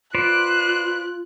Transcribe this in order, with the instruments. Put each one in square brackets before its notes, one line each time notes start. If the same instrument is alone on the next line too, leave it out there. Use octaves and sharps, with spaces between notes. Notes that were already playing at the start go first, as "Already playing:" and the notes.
[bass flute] F4 [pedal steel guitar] B4 C5 D5 [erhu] F#6